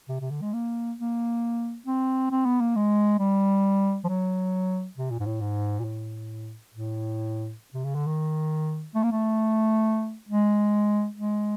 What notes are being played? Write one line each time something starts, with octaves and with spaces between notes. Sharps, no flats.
C3
C3
D3
G#3
A#3
A#3
C4
C4
B3
A#3
G#3
G3
F3
F#3
C3
A#2
G#2
A2
G#2
A#2
A2
A2
C3
C#3
D3
D#3
A3
A#3
A3
G#3
G#3